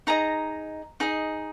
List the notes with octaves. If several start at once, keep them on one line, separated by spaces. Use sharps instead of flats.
D#4 G#4 D#5 A#5
D#4 G#4 D#5